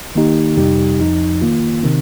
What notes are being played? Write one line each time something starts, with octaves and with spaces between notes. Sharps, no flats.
D#3 A#3 D#4 G4
F2 C3 G3 D#4 G4
F2 F3 D#4
D#3 A#3 F4
C3 D#3 C4